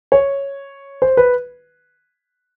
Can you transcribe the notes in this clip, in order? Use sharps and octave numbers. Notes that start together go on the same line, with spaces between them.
C#5
C5
B4